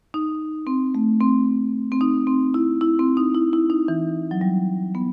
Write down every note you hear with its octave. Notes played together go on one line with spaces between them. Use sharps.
D#4
C4
A3
C4
C4
D#4
C4
E4
E4
C4
D#4
E4
E4
D#4
E3
F#3
G3
B3